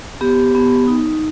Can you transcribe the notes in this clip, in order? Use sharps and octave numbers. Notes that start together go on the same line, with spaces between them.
B3 G4
B3
D#4